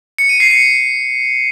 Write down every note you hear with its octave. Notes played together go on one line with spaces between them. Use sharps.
C#7
D#7
C7
C#7